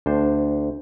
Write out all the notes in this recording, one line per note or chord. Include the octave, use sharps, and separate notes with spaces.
D2 D4 C5